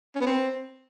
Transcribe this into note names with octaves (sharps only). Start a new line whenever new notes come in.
C#4
B3
C4